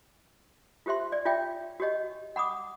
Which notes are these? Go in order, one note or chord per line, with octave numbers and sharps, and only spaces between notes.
F4 G4 C5 E5 C6
D5
F4 C#5 E5 G5
F#4 G4 C#5 D#5
F#5 B5 D6 D#6